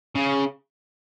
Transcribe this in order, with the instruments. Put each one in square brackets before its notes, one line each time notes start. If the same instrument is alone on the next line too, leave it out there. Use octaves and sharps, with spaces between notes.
[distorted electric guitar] C#3